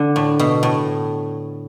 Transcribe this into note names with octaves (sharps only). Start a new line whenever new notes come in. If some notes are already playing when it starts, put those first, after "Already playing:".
Already playing: D3
A2
B2
A2